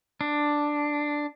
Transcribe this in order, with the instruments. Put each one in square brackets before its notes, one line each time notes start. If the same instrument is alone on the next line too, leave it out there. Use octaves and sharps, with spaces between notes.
[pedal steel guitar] D4